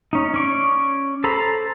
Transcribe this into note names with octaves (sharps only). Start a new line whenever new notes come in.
C#4 D#4
C#4 D5 C#6
A4 C5 A#5 B5